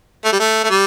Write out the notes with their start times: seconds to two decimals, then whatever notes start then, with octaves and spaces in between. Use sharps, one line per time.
0.25 A3
0.32 G3
0.40 A3
0.64 A3
0.70 G3